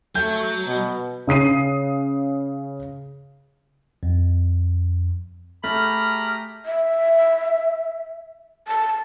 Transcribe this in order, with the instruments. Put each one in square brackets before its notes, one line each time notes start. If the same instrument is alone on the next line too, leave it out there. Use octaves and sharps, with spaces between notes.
[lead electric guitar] F#3 [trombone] A3 [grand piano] G6
[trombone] B2
[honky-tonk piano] C#3 D#6 C7 D#7
[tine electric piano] F2
[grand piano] A3 [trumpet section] G4 G#4 A#5 [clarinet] B5 [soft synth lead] F6
[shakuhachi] E5
A5